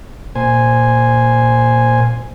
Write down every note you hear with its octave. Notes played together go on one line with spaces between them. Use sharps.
A#2 C5 G#5